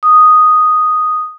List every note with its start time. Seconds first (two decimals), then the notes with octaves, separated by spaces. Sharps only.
0.03 D#6